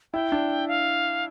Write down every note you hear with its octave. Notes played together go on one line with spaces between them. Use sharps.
E4 G5
D4
F5